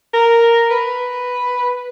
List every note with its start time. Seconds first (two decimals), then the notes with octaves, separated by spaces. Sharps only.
0.13 A#4
0.70 B4